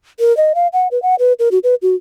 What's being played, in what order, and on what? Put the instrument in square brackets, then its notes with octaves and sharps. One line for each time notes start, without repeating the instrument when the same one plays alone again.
[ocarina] A#4
D#5
F5
F#5
B4
F#5
B4
A#4
F#4
B4
F#4